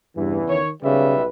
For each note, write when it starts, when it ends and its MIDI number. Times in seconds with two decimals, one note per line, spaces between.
0.17 0.58 40
0.17 0.39 43
0.17 0.58 49
0.17 0.58 52
0.49 0.71 51
0.49 0.70 73
0.83 1.28 35
0.83 1.15 49
0.83 1.25 55
0.83 1.28 71
0.83 1.25 76